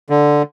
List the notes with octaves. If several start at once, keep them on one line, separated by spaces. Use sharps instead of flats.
D3